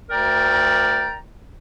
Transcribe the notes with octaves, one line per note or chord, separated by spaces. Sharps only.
D2 A#4 D5 G5 A#5